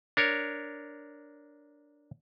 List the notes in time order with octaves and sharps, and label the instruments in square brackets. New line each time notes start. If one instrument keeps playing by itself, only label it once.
[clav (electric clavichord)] D4 A#4 C#5